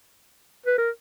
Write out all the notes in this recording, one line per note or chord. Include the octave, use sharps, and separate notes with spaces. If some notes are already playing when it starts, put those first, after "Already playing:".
B4
A#4